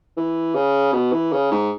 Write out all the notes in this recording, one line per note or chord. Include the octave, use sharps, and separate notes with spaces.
E3
C#3
B2
E3
C#3
G#2